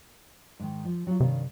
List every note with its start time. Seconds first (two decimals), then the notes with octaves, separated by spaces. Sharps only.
0.60 G#2 D#3
0.85 F3
1.07 F#3 F4
1.20 G2 C3 D#3 F5